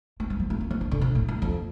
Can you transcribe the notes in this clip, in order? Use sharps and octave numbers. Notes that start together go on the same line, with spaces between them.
A3
G3
F3
A3
A#3
F3
E3
D3
C3
A2
G2
F2